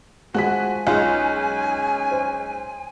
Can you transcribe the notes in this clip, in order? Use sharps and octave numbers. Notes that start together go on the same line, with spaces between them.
F3 G#3 F#4 F#5 G#5 B6
B1 G#3 C#4 F4 D#5 F5
C5